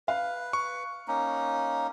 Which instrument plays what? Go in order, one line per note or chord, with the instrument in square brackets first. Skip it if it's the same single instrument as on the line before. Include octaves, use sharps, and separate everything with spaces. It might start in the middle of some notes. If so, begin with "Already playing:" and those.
[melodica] B4 [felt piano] F5
[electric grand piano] C#6
[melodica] A#3 C#4 D#4